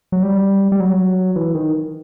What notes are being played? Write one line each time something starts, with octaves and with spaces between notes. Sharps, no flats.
F#3
G3
G3
F#3
E3
D#3